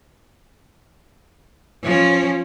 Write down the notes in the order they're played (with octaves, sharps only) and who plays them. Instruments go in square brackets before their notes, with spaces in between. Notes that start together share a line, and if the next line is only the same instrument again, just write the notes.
[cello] F3 C#4